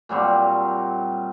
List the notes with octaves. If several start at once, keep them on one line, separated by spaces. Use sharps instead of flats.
A#2 F#3 G3 C4